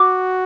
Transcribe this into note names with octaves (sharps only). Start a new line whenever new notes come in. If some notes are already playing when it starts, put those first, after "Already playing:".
Already playing: F#4 D6